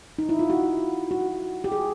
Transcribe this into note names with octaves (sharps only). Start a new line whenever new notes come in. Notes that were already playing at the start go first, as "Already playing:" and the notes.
D#4
E4
F4
F#4
F#4
G4
G#4